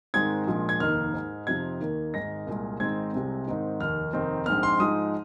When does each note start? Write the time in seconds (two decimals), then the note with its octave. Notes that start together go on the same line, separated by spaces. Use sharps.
0.14 G#2 D#3 G#3 C4 D#4 G#6
0.47 A#1 A#2 F3 G#3
0.69 G#6
0.80 F1 D#2 D#3 A#3 D#4 F6
1.14 G#2 G#3 D#4
1.47 F2 C3 F3 C4 D#4 G#6
1.80 D#2 D#3 A#3
2.14 G#1 G#2 G#3 D#4 A#6
2.47 C2 A#2 G#3
2.80 G#1 G#2 G#3 C4 D#4 G#6
3.13 C2 C3 G#3 C4
3.46 G#2 D#3 C4 D#4
3.80 F1 D#2 D#3 F6
4.13 F1 D#2 D#3 C4 D#4
4.46 A#1 G#2 G#3 C4 D#4 F6
4.63 C6
4.80 G#2 F3 G#3 D#4 D#6